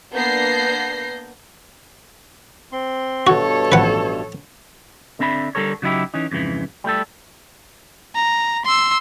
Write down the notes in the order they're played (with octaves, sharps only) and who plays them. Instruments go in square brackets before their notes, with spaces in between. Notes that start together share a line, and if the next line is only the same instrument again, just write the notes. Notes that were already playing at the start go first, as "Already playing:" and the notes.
[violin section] A#3 B3 D4 G6 A#6 C7
[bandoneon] C4 C6
[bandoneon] G2 B2 [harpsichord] F#4 [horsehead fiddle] A4 C#5
[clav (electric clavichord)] A1 A2 F3 [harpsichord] B4 F#5
[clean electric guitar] D3 C4 D4 E5 B5
D3 G3 A4 A#4 C#5
C#3 F#3 D#4 E4 G4
E3 C#4 D#4
F2 G#2 C#3 E3
G3 A3 G4 A4
[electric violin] A#5
C6 E6